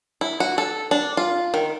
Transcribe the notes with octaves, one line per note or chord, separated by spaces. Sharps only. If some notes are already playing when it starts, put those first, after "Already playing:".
E4
F#4
A4
D4
F4
D#3